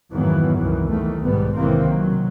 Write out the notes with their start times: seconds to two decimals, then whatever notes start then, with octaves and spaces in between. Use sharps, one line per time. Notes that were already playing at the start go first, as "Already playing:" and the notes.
0.12 F2 G#2 D#3 E3 F#3 B3
0.56 C2 F#2 D#3 E3
0.88 E2 D#3 A3
1.21 B1 G#2 G3 B3
1.56 B1 C3 D#3 E3 A#3 C4
1.90 F#3